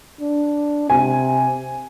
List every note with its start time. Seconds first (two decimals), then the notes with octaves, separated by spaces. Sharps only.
0.21 D4
0.90 C3 G#5